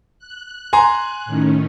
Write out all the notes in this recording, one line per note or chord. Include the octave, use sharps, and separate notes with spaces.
F#6
G#5 A#5 C6
A2 D#3 C#4